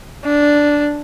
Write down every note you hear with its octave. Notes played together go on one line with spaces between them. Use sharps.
D4